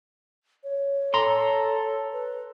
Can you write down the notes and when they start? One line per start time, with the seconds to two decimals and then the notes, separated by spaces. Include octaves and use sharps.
0.64 C#5
1.14 A4 A#5 C6
2.13 B4